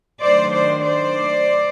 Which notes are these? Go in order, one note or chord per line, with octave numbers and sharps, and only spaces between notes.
D#3 F#3 A3 D4 C5 D5
C5 D5
C5 D5